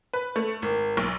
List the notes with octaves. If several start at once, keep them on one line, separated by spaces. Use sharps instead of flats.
B4
A3
G#1
B1